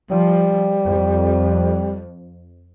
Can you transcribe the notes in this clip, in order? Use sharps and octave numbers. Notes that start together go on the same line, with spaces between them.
F3 G3
F2